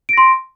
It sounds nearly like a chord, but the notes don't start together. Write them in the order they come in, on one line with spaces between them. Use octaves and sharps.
D7 A#6 C6